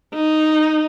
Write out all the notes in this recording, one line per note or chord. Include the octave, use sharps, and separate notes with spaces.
D#4